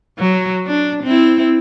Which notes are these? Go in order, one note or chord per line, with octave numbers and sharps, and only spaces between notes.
F#3
D4
C4 E4